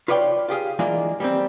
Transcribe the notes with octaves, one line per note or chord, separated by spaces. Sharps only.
F4 B4 C#5 D5 F5 G5
F4 G4 G#4 F5
E3 G#3 A#3 D4 F4
G3 A#3 C4